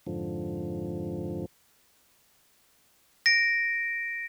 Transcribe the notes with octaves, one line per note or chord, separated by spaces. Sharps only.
F2 G#2 D3 F3
A#6 D7